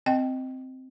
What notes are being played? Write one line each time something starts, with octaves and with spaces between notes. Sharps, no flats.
C4 D#5 G5